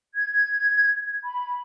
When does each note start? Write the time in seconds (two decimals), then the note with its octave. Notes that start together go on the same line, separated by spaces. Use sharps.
0.15 G#6
1.24 B5